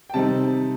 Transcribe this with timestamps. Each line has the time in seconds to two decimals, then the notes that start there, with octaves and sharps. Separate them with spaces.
0.10 G5
0.14 C3 G3 C4 D#4 A5